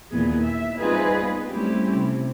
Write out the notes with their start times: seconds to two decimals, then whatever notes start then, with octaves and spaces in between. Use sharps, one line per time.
0.11 D#2 A#2 E3 A#3 B3 G#4
0.42 E5
0.80 G3 C4 D#4 F4 G#4 B4
1.22 B3
1.50 G3 A3 C4 C#4 E4 G4
1.95 C3